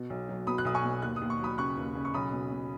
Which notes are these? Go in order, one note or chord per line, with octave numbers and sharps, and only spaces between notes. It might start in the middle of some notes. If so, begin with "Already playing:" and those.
Already playing: B2
B1
F#3
B2 B5 D#6
F#6
B1 D#6
G#5 C#6
B2
D#2 F#6
D#6
D#2
C#6
F#3 B5 D#6
C#3 C#6 F#6
D#2
C#3
C#6
B1 B5 D#6
B2
B2